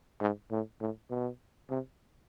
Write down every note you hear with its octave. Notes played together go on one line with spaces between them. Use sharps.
G#2
A2
A2
B2
C3